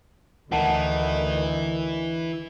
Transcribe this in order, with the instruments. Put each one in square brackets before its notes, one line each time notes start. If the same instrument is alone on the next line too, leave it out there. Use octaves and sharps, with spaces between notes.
[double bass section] D2 [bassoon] D#3 [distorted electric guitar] E3 E4 [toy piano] F#5 A5 A#5